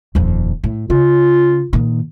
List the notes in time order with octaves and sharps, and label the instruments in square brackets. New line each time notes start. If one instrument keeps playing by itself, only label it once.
[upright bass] D#1 F2
A2
[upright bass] C#3 [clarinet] F4
[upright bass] A#2 D#3